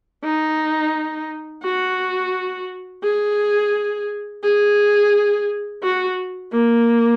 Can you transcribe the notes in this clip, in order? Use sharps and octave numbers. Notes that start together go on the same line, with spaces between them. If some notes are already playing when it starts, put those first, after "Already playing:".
D#4
F#4
G#4
G#4
F#4
A#3